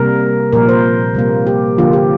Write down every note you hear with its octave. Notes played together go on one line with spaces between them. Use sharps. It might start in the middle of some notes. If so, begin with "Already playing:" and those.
Already playing: C3 G3 A#3 A#4
A#2 F3 A#3 A#4
C5
C3 G3 A#3
G4
D3 F3 A#3 F4
G4